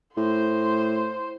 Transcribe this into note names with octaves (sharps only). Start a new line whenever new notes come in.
A2 C5 C6